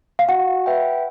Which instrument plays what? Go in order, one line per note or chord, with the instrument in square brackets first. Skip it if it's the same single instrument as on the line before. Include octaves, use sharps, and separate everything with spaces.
[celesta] F5
[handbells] F#4 [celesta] F#5
[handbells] B4 E5 G5